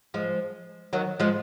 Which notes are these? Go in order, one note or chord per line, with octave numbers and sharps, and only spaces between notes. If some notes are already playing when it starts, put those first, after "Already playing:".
F3 G#3
D#3 F#3
F3 G#3